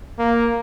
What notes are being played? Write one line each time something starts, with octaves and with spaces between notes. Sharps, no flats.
A#3